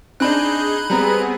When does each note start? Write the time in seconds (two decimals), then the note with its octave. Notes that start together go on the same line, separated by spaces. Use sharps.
0.20 C4 D4 D#4 G#4 B5 F#6 G6
0.90 G3 B3 C4 G#4 A#5